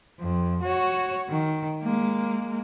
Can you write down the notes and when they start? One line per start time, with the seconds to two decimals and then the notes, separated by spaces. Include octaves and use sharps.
0.20 F2
0.62 F#4 C#5
1.29 D#3
1.83 G#3 A#3